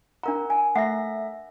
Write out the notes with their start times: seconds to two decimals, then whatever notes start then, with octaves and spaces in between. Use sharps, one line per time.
0.23 D4 A#4 F#5 A#5
0.50 G#5
0.76 A3 E5 F#5 A#6